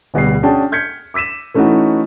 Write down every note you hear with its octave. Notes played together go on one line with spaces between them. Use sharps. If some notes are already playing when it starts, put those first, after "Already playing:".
D1 B2 G3 C7
C#4 D4 F#4 G#4 G5 A5
F6 G6 G#6 B6 C#7
D6 E6 B6 D#7 E7
E3 A3 C#4 D#4 E4 F#4